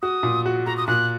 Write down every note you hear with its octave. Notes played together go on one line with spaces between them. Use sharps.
F#4 D#6
A#2
F#4
F#4 A#5
D#6
A#2 F#6